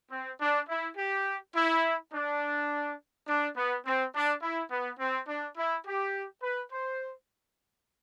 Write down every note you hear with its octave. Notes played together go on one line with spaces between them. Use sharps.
C4
D4
E4
G4
E4
D4
D4
B3
C4
D4
E4
B3
C4
D4
E4
G4
B4
C5